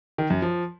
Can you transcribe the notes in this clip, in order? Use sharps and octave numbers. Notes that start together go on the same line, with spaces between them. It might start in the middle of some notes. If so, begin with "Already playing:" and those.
D#3
F#2
F3